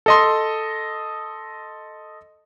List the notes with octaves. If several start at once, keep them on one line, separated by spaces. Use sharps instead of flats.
A4 D#5 C6